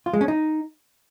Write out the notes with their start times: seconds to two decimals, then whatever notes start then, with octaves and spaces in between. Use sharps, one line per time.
0.06 F4
0.13 G#3
0.21 C#4
0.28 D#4